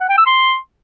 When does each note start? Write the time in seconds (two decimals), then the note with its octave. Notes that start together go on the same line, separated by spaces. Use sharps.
0.01 F#5
0.09 G5
0.18 E6
0.26 C6